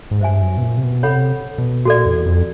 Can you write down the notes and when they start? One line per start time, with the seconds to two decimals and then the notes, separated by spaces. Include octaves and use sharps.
0.11 G#2
0.21 G2 C5 E5 G#5
0.42 F#2
0.58 B2
0.63 A#2
0.77 C3
0.83 B2
1.03 C3 A4 C#5 F#5 B5
1.58 B2
1.85 A#2 F#4 A4 D5
2.06 E2
2.26 F2